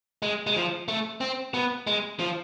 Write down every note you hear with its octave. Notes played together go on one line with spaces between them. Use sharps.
G#3
G#3
F3
A3
C4
B3
G#3
F3